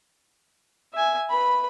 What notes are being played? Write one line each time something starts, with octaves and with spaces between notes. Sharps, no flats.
E5 G#5
B4 B5